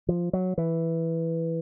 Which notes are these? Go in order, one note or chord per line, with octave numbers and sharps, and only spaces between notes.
F3
F#3
E3